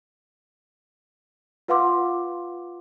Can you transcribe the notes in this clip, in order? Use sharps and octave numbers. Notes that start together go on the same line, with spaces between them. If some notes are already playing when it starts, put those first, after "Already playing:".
F4 B4 F5 F#5 C6 D6